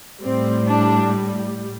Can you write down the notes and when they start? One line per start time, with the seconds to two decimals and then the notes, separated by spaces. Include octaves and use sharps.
0.21 A2 G3 C4
0.68 D4